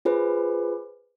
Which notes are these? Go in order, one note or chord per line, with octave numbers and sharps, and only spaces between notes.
F4 G#4 B4 C5